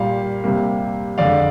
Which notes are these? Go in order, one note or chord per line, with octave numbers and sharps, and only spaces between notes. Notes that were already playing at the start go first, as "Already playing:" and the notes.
Already playing: A#2 G3 A#3 F5
C3 G3 A#3
F2 D3 G#3 D5 F5